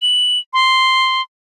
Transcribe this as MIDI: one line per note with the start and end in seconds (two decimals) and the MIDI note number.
0.02 0.39 102
0.53 1.22 84